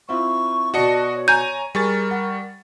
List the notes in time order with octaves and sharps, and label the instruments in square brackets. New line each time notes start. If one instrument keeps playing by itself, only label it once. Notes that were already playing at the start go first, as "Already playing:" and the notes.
[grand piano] C4 E4 F4 [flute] C#6
[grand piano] B2 D5 [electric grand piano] F#4 D#5 C#7 [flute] A5
[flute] C#5
[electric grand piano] G#5 A#5 D#7 [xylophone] G6
[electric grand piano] G3 C#6 A6 [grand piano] G#4 [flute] A#4
[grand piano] F#5